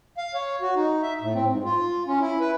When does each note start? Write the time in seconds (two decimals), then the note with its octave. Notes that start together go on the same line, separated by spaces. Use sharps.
0.18 F5
0.34 C#5
0.61 F#4
0.76 D#4
1.02 E5
1.21 A2
1.34 C4
1.48 G#2
1.64 F4
2.07 C#4
2.20 E4
2.40 B4